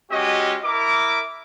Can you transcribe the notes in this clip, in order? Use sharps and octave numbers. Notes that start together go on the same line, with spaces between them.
G#3 C#4 F#4 G4 D#5
E4 A#4 E5 D6